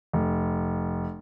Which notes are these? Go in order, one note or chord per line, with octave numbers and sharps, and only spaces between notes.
F1